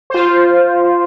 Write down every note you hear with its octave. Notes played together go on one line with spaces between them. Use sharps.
F4 C5